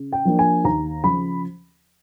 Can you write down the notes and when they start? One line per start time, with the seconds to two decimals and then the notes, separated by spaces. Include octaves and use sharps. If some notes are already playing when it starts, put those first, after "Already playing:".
Already playing: C#3
0.12 G5
0.25 F3 A#3 D4
0.39 G#5
0.64 D#2 A#5
1.04 C#3 F3 B5